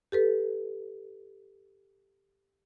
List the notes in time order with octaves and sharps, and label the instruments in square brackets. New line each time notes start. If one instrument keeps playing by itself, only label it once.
[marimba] G4 A4 B4